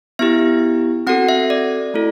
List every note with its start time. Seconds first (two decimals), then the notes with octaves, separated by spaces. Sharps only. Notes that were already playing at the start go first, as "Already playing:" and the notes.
0.19 B3 E4 G4 E5
1.07 C4 F#4 A4 F#5
1.29 E5
1.50 D5
1.94 A3 E4 A4